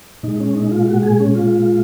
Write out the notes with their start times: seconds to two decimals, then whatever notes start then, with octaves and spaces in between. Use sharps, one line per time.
0.23 A#2 G#3 D#4
0.40 C#4
0.55 D#4
0.71 F4
0.88 F#4
1.03 G#4
1.20 C#4
1.35 F4